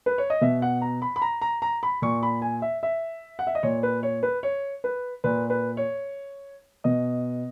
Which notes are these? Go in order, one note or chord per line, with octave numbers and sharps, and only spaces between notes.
B4
C#5
D#5
B2 E5
F#5
A#5
B5
B5
A#5
A#5
A#5
B5
A#2 C#6
B5
G#5
E5
E5
F#5
E5
D#5
A#2 C#5
B4
C#5
B4
C#5
B4
A#2 B4
B4
C#5
B2 D#5